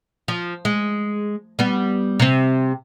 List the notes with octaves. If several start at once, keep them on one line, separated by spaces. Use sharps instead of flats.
F3
G#3
G3 B3
C3 C4